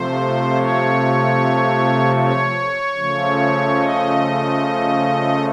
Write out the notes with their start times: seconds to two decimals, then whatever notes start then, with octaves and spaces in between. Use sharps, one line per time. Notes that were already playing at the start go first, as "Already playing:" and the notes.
Already playing: C3 F3 A3 C5
0.55 C#5
2.16 C#5
2.96 C#3 F3 A3
3.76 D#5